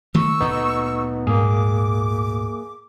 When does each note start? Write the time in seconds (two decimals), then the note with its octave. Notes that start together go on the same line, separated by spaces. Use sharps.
0.14 D#3 A3 A#3 C#6 E6
0.40 D2 A#2 B3 D#4
1.27 G#2 A#3 G#4 D6